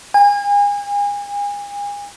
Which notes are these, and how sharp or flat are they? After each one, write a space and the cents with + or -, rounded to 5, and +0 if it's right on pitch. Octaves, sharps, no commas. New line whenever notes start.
G#5 -35